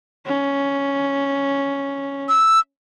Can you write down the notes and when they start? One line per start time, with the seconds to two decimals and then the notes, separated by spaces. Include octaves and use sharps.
0.26 C#4
2.29 E6